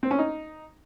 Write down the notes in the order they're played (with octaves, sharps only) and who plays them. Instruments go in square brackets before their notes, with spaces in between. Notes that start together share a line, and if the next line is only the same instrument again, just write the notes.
[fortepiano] C4
C#4
D#4